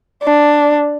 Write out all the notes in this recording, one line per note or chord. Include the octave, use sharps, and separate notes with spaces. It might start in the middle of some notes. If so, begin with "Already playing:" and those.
D4